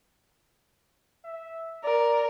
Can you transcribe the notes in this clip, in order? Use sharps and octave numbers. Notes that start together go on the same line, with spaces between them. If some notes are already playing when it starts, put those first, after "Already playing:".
E5
A#4 D5